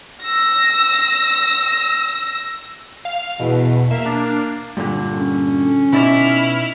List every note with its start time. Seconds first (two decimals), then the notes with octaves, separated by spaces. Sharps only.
0.22 E6 A#6
3.05 F5
3.40 E2 B2
3.91 A#3 E5
4.06 D4
4.77 G2 A#2 D3
5.17 C#4
5.93 B2 D#4 E4 D5 F6